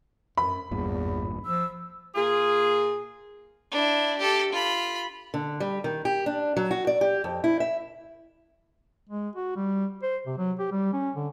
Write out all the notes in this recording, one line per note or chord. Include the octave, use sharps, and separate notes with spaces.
F#2 B5
G#1 E2 G2 A#2
F3 E6
A#2 F4 G#4
D4 E4
G4 A4
F4 B5
D3
G3
D#3
G4
D4
F#3
F#4
D5
G4
F2
E4
E5
G#3
F#4
G3
C5
C3
F#3
G4
G3
C#4
D3